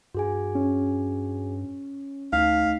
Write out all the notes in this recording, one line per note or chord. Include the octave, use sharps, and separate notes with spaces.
G2 F#4 G#4 G#5
C#4
D2 A3 D#4 F5 B6